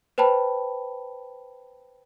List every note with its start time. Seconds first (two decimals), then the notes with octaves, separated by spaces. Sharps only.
0.18 B4 C5 G5 A5 B5